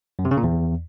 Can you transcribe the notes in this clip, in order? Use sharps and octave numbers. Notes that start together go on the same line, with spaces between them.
F#2
C3
C#3
A#2
E2